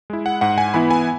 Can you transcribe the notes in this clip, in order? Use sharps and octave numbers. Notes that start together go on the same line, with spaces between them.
G#3 E4
F#5
G#2 F#5
G#5
E3 B3 E4 B5
G#5